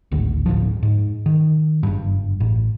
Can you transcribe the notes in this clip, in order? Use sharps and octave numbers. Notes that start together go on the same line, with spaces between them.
D1 G#1 D2
G1 D2 A2 F3
G#2
D#3
F#1 G2
A1